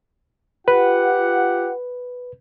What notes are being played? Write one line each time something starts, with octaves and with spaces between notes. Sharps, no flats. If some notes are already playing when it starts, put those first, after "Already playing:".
F4 G4 B4 F#5